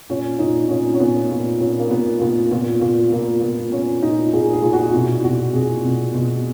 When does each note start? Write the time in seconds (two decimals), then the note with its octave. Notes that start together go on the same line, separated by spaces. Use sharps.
0.10 A#2 C#4
0.39 A#2 D#4
0.69 A#2 C#4
0.94 C#4
1.00 A#2 B3
1.31 A#2
1.60 A#2 C#4
1.79 A#3
1.90 A#2 B3
2.20 A#2 B3
2.51 A#2 B3
2.81 A#2
3.12 A#2 A#3
3.42 A#2 B3
3.72 A#2 C#4
4.02 A#2 D#4
4.33 A#2 G#4
4.53 G#4
4.63 A#2
4.73 F#4
4.88 F#4
4.94 B2 E4
5.20 E4
5.24 B2 F#4
5.54 B2 G#4
5.84 B2
6.15 B2